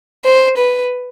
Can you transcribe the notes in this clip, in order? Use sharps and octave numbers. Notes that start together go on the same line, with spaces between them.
C5
B4